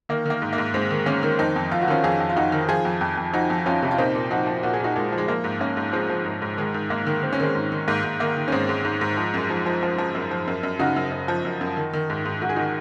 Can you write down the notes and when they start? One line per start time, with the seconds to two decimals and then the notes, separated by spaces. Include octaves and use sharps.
0.09 D#3 A#3
0.26 D#3 A#3
0.42 G#2
0.53 A#3
0.58 G#2
0.74 G#2 G#3 C4
0.91 D#3
1.06 D#3 A#3 C#4
1.23 D#3
1.38 F2 C4 D#4
1.56 F2
1.71 F2 F4
1.81 F#4
1.88 D#3 C#4 F4
2.04 F2 F4 G#4
2.20 F2
2.29 F4
2.36 F2 D#4 F#4
2.52 D#3
2.69 F3 F4 G#4
2.85 F2
3.01 F2
3.17 F2
3.33 F3 D#4 F#4
3.50 F2
3.66 F2 C#4 F4
3.82 C3
3.91 F4
3.98 A#2 C4 D#4
4.15 A#2
4.30 F3 D#4 F#4
4.47 F3
4.63 A#2 F#4
4.74 G#4
4.80 A#2 D#4 F#4
4.96 A#2 G#3
5.12 F3
5.18 G#3
5.28 F3 A#3
5.44 G#2
5.60 G#2 A#3 C#4
5.77 G#2
5.93 F3 G#3 C4
6.10 F3
6.25 G#2
6.42 G#2
6.58 D#3 G#3
6.74 G#2
6.90 G#2 A#3
7.07 D#3
7.22 D#3 C4
7.33 C#4
7.40 D#3 G#3 C4
7.55 G#2
7.72 D#3
7.88 G#2 A#3
8.04 G#2
8.20 D#3 A#3
8.37 D#3
8.48 C#4
8.52 G#2 G#3 C4
8.69 G#2
8.85 G#2
9.01 G#2
9.17 F3
9.34 F#2
9.50 F3
9.66 F3
9.83 F3
9.98 F3
10.15 F#2
10.31 F3
10.47 F#2
10.63 F#2
10.79 C#3 D#4 F#4
10.96 F#2
11.12 F#2
11.28 F3
11.45 F#2
11.61 F#2
11.77 D#3
11.94 D#3
12.10 G#2
12.25 G#2
12.42 G#2 F#4
12.49 G#4
12.56 D#3 D#4 F#4